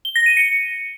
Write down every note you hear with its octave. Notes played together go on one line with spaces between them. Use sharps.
G7
A#6
D#7
C#7